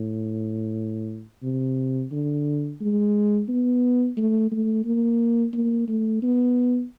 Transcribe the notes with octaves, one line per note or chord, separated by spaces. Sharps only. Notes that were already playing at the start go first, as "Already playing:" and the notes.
Already playing: A2
C3
D3
G#3
B3
A3
A3
A#3
A#3
A3
B3